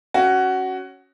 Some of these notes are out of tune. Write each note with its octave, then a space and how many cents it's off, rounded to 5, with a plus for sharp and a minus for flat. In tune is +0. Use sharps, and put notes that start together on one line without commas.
C#4 +0 F#4 +15